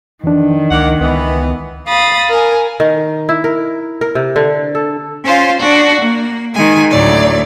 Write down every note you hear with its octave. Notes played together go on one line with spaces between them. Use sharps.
F2 D#3 E3 D4
C#2 A#3 D5 F#5
C#2 E3 B3
F5 B5 D#6 A6
A#4 G#5
D#3
E4
A#4
A#4
C3
D3
A4
C#4 F4 C5
D4 F#4
A#3
D#3 G#3 G#5
D2 A2 F#3 D5